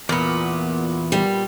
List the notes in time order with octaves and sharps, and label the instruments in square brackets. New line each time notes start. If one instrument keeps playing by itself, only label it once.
[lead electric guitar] E2 [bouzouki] A#2 B3
[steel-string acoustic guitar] G3